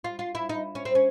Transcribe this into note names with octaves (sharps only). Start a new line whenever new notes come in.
F4
F4
E4
D#4
C#4
C4
C#4